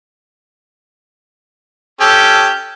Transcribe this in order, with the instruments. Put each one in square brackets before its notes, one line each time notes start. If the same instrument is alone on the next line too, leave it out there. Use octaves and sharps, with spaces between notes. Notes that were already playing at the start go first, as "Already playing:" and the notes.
[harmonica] C#4 G4 A4